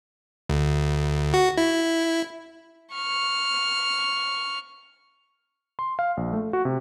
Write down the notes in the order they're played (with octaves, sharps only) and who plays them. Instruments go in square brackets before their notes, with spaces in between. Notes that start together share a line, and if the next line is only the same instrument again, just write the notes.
[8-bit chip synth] D2
F#4
E4
[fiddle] C#6 F6
[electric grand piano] C6
F5
A#1
A3
F#4
C3